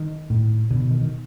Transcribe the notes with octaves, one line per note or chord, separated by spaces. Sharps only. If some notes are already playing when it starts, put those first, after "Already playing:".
Already playing: D#3
A2
B2 D3
D#3
D#3
D#3